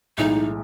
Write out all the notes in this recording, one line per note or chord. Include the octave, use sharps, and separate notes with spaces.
B1 A2 E3 G#3 D#4